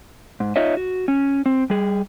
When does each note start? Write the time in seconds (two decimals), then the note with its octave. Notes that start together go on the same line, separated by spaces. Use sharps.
0.40 G#2
0.56 D#4 F4 C#5 D#5 E5
0.77 F#4
1.08 C#4
1.46 C4
1.70 G3 G#4